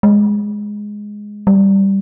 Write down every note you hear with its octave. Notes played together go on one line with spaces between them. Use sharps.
G#3
G3